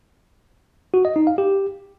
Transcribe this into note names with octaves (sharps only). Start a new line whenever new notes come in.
F#4
D#5
D#4
F5
G4